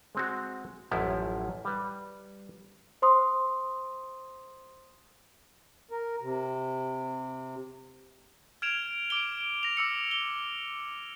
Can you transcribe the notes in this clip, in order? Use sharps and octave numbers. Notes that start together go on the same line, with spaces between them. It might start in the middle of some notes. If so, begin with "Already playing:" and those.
G#3 C4 F#4
A1 F#2 F3 E4
G3 B4
C5 C6 D#6
A#4
C3
F6 G#6 D7 E7 F7
D6 D7 G7
A#6 F7
D6 E6 C#7
G7